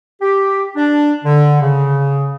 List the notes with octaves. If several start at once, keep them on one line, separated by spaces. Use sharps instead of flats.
G4
D4
D3
C#3